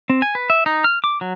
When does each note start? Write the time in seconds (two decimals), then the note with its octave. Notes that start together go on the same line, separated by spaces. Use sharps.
0.10 C4
0.22 G#5
0.35 B4
0.50 E5
0.66 D#4
0.84 F6
1.04 D6
1.21 F#3